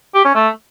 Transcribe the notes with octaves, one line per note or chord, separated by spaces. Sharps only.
G4
C#4
A3